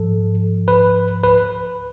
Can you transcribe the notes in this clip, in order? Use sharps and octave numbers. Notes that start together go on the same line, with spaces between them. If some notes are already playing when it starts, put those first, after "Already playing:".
Already playing: G#2 F3 A4
B4
B4